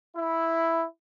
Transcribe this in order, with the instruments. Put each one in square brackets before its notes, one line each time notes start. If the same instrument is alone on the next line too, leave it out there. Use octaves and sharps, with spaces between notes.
[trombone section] E4